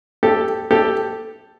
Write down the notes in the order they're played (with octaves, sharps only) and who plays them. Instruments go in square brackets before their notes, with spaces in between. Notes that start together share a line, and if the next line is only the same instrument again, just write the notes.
[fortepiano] G4 A4
G4 A4